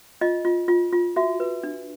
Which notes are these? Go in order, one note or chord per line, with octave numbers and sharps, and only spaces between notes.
F4 D#5
F4
F4
F4
F#4 E5
B4
D4